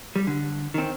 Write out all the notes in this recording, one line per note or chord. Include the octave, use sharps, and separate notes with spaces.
G3
D3
D#3 C4